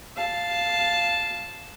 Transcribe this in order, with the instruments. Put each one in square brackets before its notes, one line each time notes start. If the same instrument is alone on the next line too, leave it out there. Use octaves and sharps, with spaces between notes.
[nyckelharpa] F5 A5